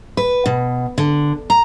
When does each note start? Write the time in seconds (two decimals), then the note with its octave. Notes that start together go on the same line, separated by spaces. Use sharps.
0.17 B4
0.46 B2
0.98 D3
1.50 A#5